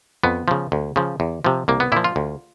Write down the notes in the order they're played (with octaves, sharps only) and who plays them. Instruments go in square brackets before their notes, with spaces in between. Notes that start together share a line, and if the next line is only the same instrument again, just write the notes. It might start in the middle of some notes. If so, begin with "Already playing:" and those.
[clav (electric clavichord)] F2 B3
C#3 F3
D2
C#3 F3
E2
C3 F3
C2 A#3
B3
A#2 F3 E4
F4
D2